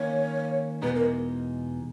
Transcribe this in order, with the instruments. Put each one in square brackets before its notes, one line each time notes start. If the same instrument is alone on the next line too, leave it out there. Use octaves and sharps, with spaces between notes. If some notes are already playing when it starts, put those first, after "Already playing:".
Already playing: [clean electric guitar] D#3 A#3 C#4 [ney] C#5
[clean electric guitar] E2 B2 G#3 D#4 [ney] B4
[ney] A#4